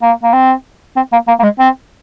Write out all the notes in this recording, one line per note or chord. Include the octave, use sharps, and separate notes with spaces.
A#3
A#3
C4
C4
A#3
A#3
A#3
G#3
C4